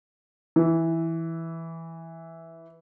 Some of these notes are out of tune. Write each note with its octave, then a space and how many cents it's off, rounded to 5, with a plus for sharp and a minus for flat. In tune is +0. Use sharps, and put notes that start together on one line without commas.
E3 -5